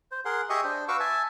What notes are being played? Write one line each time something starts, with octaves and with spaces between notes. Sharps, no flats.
C5
G#4 A#4 F#5 C6
G4 G#4 D#5 E5 C#6 D#6
D4 C5
F#4 B4 F5 C#6 D6 E6
E5 G#5 A5